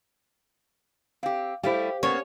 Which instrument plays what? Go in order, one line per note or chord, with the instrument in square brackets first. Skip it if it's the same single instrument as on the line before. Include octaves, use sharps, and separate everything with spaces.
[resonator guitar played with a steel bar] C4 G4 [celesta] F5
[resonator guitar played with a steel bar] G3 A3 E4 [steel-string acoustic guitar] G4 [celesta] C5 F5
[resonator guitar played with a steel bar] A#3 B3 [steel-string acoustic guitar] C#4 [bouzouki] C#5